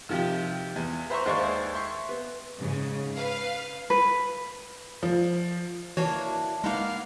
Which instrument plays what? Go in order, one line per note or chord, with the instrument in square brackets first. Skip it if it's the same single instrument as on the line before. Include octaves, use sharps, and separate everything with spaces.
[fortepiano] C3 D#3 F3 F4 G4
E2
B4 C5 E5 A#5 C6 C#6
D#2 G#3 C5 D5 F5 C#6
E5 C6 C#6
B3
[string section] G#2 C#3
B4 F5 C7
[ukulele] B4
[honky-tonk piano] F3
[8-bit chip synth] E3 F#4 C#5 [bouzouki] A#3 D4 E4
[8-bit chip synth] G#3 D#4 [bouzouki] A#3 B3 [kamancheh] F5